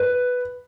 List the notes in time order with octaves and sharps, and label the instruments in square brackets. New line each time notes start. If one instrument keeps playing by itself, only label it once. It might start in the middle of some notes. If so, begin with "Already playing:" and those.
Already playing: [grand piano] B4